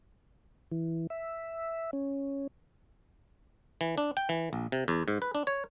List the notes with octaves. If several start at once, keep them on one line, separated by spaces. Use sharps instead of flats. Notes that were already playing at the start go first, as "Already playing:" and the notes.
E3
E5
C#4
E3
D4
G5
E3
A#1
C3
E2
G#2
B4
D4
C#5